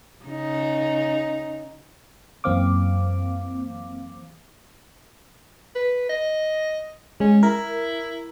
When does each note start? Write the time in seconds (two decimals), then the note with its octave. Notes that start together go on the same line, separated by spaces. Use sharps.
0.25 C#3 D#4
2.44 F#2 E3 A#3 C4 F5 D6
5.75 B4
6.09 D#5
7.20 G#3 C#4
7.43 E4 A#4